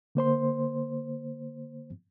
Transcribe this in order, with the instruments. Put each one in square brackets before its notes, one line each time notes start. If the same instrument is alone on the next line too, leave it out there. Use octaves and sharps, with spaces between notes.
[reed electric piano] D3 A#3 C5 C6